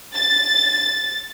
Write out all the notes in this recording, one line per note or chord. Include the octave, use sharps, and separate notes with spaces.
A6